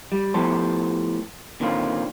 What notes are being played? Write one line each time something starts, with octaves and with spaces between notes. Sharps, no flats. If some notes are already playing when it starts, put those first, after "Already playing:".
G3
A2 F3 B3 G4 A4 C5
A#2 D3 D#3 C4 C#4 F4